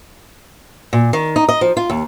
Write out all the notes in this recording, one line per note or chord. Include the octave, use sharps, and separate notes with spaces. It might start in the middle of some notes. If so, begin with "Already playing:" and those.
A#2
D#3
D#4
D#5
F3
F4
D#2